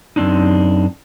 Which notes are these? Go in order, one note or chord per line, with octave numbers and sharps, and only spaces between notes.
F#2 C#3 C4 D4 D#4